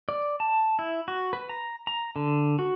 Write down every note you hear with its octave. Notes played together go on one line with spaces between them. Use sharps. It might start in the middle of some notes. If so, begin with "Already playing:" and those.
D5
A5
E4
F#4
B4
A#5
A#5
D3
F#4